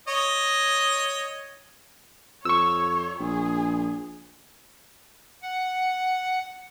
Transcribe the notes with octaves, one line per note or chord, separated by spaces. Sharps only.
C#5 D#5
F2 C#5 C#6 E6
A#1 G#4
F#5